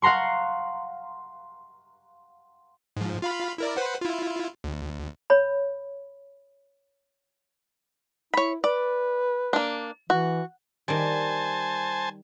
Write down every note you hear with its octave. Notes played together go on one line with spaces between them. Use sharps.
F5 F#5 A#5 C6 C#6
G#2 F3
F4 F5 B5
E4 A#4 D5
B4 C5 F#5
E4 F4
D2
C#5 B5
E4 C#5 B5
B4 D5
A#3 D4
E3 F#4
D#3 G3 C5 G#5 A5